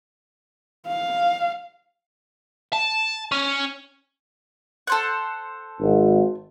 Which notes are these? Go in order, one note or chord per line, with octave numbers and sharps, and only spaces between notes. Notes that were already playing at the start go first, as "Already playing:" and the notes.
F5
A5
C#4
A4 C5 F#5
G#1